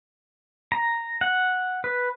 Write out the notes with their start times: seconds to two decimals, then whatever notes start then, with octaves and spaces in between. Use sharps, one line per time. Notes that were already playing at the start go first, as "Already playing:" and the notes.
0.72 A#5
1.21 F#5
1.84 B4